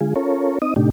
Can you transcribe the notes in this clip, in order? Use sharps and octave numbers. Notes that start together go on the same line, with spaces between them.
D3 G#3 F4 G#4
C#4 F4 A4 A#4 C#5
C4 D#4 D#5 D#6
A2 C3 A3 D4 D#4 G4